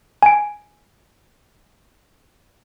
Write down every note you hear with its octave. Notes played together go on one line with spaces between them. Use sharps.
G#5 D7